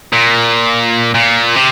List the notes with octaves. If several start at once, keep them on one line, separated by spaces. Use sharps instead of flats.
A#2
A#2
C3